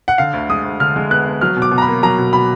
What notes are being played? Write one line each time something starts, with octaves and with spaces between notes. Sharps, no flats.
F#5
D3 F5
D2
G#3 D#6
D2
D3 F6
G#3
B3 F#6
B3
F#3 F6
B2
D6
B2
A#5
B5
A#3
F#3 A#5
B2
B2 B5